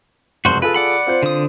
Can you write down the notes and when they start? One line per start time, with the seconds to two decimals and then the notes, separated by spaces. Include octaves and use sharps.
0.45 F1 C#2 F#2 F#4 C5
0.62 F4 G#4 A4 B4
0.74 D5 F#5 B5
1.07 C4 F4 C5
1.23 D3 D#6